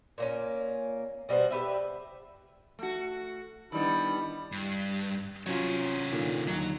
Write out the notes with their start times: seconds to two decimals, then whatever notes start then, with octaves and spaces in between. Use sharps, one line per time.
0.18 A#2 A#3 C#4
1.29 B2 G3 F#4 C5
1.51 G4 B4 E5
2.79 A3 F#4
3.72 D#3 G3 B3 D4 E4 B5
4.52 G2
5.46 C3 F#3 C#4 F4 C#5
6.12 A#2 D3 D#3
6.48 D#2 F#3 D#4